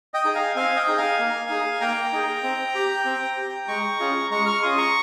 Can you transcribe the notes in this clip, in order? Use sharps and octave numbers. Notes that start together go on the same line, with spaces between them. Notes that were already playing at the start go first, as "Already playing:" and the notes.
D#5 G5
D#4 G#4
F5 G#5
C4 F5 G#5
D#5 G5
D#4 G#4
F5 G#5
A#3
D#4 G#4
A#3 G5 A#5
D#4 G#4
C4
G4
C4
G4
G#3 A#5 C#6
C#4 F4 G#4
G#3 A#5 C#6
C#6 F6
C#4 F4 G#4 C6 D#6
A#5 C#6